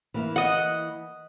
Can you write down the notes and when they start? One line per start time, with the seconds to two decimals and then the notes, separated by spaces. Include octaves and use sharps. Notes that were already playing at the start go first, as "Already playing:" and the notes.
0.14 E3 A#3 E4
0.36 D#5 F#5